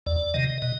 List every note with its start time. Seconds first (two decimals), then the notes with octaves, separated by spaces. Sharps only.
0.06 E2 D5
0.34 C3 D#3 D#5
0.62 B2 D#5